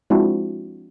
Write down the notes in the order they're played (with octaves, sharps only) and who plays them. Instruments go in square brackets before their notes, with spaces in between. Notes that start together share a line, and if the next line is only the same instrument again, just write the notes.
[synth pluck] F3 G#3 C4 D4 E4 F#4